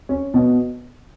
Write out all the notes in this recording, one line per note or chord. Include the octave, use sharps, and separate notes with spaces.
C#4
B2